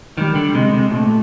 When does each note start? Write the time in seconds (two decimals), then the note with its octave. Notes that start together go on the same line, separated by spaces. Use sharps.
0.17 D#3 G3
0.35 D3
0.54 C3 G#3
0.74 C3
0.91 A#2 A3